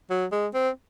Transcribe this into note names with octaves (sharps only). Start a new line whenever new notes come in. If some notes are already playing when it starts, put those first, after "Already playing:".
F#3
G#3
C4